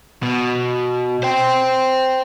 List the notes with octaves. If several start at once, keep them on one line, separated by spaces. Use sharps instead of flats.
B2
C5 G5